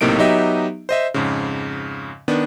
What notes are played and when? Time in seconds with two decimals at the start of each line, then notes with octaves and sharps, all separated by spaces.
0.01 B1 A2 C3 A#3 D#4 D7
0.19 F#3 B3 D#4 G4 D#5 E5
0.89 C5 D#5 E5
1.14 F2 G#2 C#3
2.28 D#3 B3 D4